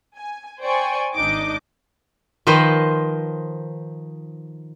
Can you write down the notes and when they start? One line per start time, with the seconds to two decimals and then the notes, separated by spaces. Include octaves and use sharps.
0.15 G#5
0.60 C5 D5 G5 G#5 C#6
1.15 G#1 D4 D#4 D#5 D6
2.47 D#3 F3 B4 C5 D#5